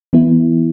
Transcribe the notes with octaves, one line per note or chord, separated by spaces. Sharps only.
E3 B3 E4